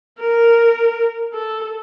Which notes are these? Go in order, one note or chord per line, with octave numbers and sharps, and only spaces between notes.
A#4
A4